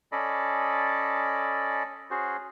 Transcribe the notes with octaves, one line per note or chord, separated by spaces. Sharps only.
C#4 A4 D5 D#5 B5
C#4 F#4 G#4 C5